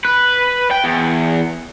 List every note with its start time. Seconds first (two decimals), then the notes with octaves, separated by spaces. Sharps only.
0.05 B4
0.71 G5
0.84 E2